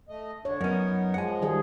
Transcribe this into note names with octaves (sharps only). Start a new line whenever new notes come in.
A3 D#5
D3 D4 C#5
F#2 B3 C#4 D#4 A#4
F3 G#3 F#5 G#5
D#3 G3 G#4